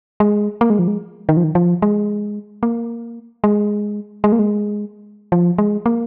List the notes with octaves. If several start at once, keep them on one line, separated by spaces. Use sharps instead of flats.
G#3
A#3
G#3
F3
G#3
D#3
F3
D#3
F3
G#3
A#3
G#3
G#3
A#3
G#3
F3
G#3
A#3